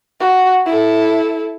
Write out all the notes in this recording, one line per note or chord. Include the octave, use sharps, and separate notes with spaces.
F#4
E4 A4